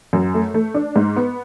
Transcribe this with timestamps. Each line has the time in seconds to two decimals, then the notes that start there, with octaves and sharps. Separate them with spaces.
0.13 F#2
0.34 A3
0.54 A3
0.75 D4
0.96 G#2
1.16 B3